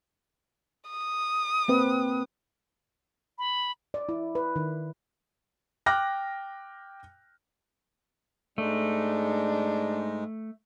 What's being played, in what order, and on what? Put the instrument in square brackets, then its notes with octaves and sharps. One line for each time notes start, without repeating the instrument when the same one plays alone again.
[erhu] D#6
[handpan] A#3 C4 B4
[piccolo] B5
[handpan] D5
E4
B4
D#3
[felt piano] G5 D6 F6 F#6 A#6
[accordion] G#2 G#3 [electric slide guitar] A3 [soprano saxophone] D4